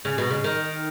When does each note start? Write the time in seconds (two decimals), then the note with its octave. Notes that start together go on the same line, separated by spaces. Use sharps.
0.05 C#3
0.18 B2
0.30 C#3
0.44 D#3